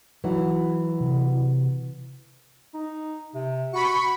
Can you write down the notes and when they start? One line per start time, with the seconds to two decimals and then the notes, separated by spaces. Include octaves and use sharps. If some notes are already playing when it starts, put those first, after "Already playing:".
0.24 E3 F#3 E4 F#4
1.01 C3
2.74 D#4
3.34 C3
3.73 F#4 B5 C#6